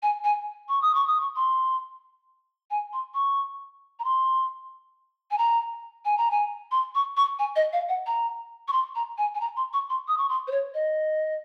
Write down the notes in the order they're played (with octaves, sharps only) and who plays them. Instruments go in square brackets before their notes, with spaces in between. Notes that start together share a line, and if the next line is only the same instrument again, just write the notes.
[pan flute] G#5
G#5
C#6
D#6
C#6
D#6
C#6
C6
G#5
C6
C#6
A#5
C6
G#5
A#5
G#5
A#5
G#5
C6
C#6
C#6
G#5
D#5
F5
F#5
A#5
C#6
C6
A#5
G#5
G#5
A#5
C6
C#6
C6
D#6
C#6
C6
C5
C#5
D#5